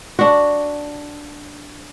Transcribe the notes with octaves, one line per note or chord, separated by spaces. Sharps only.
D4 F#4